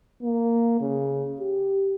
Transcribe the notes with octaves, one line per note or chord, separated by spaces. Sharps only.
A#3
C#3
G4